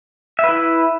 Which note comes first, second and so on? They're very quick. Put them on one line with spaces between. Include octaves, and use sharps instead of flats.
E5 B4 E4